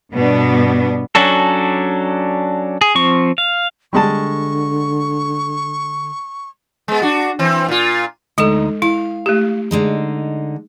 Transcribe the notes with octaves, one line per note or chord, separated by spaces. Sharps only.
G2 B2 B3 D4
F#3 C#4 D4 F#4 A4
G#4
F3 C4 C#6
F5
D3 G3 G#3 A5 C#6
G#3 B3
D4 F#4
E3 C4
A#2 F4
D2 G#3 D#4 A4
E4 F5
A3 G4
D3 G#3 D#4